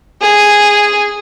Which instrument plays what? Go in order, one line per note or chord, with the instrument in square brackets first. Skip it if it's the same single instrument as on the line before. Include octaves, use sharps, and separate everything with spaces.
[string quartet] G#4